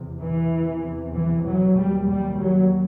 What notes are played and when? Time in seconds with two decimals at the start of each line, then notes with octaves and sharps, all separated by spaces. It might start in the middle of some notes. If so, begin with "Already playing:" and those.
Already playing: E2 C3
0.21 E3
0.53 E2 C3
1.15 E3
1.46 F#3
1.77 D#2 G3
2.09 G3
2.40 F#3